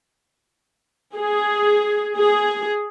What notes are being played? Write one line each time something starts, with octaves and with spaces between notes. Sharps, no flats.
G#4
G#4